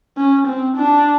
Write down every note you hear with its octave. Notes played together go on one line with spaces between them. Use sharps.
C#4
C4
D4